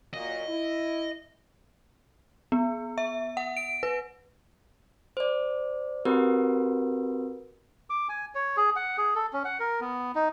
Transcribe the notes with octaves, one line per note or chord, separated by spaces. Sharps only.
A#2 F#3 D#5
E4
B3
E5
F#5
D7
B4
C5 D5
C4 F#4 G4 A#4 B4
D6
G#5
C#5
G#4
F#5
G#4
A4
C#4
F#5
A#4
B3
D#4